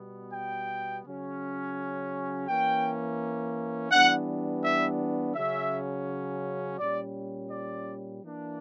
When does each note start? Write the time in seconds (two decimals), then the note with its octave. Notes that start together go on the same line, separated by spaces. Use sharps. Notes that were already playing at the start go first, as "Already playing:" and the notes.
Already playing: B2 G3 B3
0.33 G5
1.04 C#3 F#3 C#4
2.47 E3 A#3 C#4 G5
3.91 E3 G3 B3 D4 F#5
4.63 E5
5.35 C#3 F#3 C#4 E5
6.78 A#2 G3 C#4 D5
7.50 D5
8.22 E3 A#3 D4